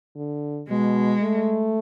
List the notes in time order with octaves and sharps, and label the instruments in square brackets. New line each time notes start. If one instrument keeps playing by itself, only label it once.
[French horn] D3
[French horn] B2 [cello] G#3
[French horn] A3